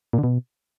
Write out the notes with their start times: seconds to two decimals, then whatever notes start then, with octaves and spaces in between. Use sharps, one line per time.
0.13 A#2
0.18 D3
0.23 B2